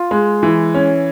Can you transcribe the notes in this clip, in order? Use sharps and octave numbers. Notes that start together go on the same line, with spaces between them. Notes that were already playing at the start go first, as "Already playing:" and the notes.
Already playing: F4
G#3
E3
C#4